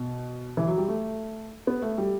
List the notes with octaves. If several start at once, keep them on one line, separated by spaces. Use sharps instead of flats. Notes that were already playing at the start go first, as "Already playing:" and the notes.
Already playing: B2
E3
F#3
G3
A3
B3
A3
G3